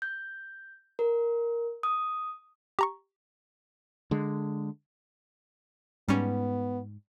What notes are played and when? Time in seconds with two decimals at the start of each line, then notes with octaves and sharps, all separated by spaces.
0.02 G6
0.99 A#4
1.83 D#6
2.79 G4 A#5 C#6
4.11 D3 G#3
6.09 G#2 G3 B3 C#4